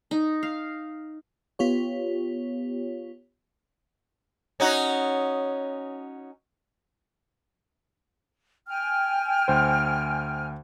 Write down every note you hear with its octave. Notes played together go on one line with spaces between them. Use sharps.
D#4
F5
B3 F4 G4 C#5
C#4 D#4 F#4
G5 G#5 F6
D2 C5